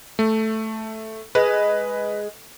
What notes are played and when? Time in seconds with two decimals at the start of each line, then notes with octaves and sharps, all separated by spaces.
0.19 A3
1.35 G#3 B4